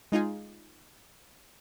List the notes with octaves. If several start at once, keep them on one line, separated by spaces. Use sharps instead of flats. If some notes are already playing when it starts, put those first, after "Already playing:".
G#3 D#4 F4 G#4